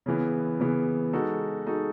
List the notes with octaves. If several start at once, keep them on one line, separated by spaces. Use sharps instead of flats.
C#3 E3 B3
C#3 E3 B3
G#3 D#4 F#4 A4
G#3 D#4 F#4 A4